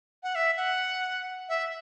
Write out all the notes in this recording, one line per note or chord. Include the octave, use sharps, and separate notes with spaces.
F#5
E5
F#5
E5